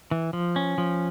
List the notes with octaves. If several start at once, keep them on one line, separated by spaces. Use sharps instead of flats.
E3
F3
C#4
F3